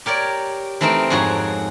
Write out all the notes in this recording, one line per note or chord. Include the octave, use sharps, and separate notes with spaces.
G4 A#4 C#5 D5
E3 A3 C4 D#4 A#4
F2 G#2 F#4 G#4 C#5 A#5